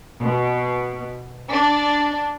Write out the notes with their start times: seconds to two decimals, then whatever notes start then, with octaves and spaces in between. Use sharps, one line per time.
0.22 B2
1.52 D4